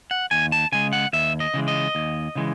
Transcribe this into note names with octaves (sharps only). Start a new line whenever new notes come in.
F#5
D#2 G#5
A5
C#3 G#3 G#5
F#5
D#2 E5
D#5
C#3 E3 G#3
D#5
D#2
C#3 E3 G#3